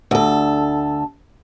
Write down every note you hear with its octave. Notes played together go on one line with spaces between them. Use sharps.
D2 A4